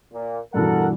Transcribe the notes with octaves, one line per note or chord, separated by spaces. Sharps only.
A#2
G2 B2 E3 A4 A#4 F#5